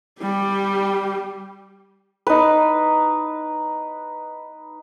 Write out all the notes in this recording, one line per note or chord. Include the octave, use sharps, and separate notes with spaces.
G3 G4
D#4 B4